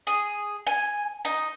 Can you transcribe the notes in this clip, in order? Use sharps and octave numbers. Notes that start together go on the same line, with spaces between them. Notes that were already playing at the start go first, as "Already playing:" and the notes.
G#4
G#5
D#4